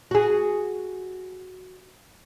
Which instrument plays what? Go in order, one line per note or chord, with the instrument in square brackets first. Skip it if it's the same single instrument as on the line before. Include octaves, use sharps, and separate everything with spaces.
[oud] F#4 G#4